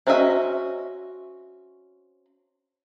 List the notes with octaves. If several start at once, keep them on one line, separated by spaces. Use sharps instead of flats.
C4 C#4 F#4 D#5 E5